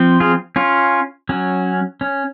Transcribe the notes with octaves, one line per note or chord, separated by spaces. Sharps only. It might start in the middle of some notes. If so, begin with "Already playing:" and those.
Already playing: F3 C4
F4 G#4
C#4 F4
F#3 C#4
C#4